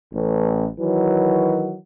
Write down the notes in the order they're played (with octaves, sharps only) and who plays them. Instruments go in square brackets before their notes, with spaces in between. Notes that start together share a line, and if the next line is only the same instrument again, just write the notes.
[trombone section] A1
D#3 E3 F#3